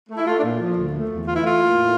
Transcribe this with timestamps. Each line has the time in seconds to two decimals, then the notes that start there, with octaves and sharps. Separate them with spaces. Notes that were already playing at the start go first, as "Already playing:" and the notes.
0.09 A3
0.16 E4
0.26 A3 F4
0.37 D4
0.42 A#2
0.59 F3
0.75 D2
0.92 A3
1.08 E2
1.25 E3 F4
1.35 E4
1.42 A3 F4
1.58 A#3
1.75 A2